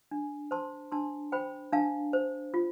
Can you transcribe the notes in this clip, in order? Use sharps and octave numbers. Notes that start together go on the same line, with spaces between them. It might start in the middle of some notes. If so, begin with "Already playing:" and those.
D4
C5 A5 C6
D4 A5 C6
C5 G5 B5
D4 F5 A5
C5
F4